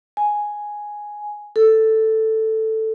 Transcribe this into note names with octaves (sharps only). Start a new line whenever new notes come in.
G#5
A4